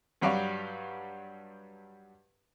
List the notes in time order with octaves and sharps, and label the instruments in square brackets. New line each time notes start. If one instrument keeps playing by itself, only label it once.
[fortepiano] G2 F#3 G3 G4 F5 C#6